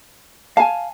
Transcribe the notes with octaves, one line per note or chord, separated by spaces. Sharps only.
F5 G#5 A5